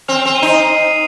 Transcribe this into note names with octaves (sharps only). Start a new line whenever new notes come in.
C4 F6 F7
C4 F7
D#7
D#4 C7
D#6 D#7